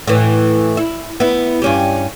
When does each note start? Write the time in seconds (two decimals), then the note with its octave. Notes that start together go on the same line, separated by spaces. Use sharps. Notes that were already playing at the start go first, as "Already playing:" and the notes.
0.07 A2 E3
0.77 E4
1.20 B3 E4
1.62 G2 C#4 G4